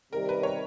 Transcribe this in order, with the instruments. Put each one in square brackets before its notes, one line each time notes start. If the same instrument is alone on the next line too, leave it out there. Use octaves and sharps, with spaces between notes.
[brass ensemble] C3 D#3 G3 [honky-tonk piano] A#4
[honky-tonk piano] B4
C#5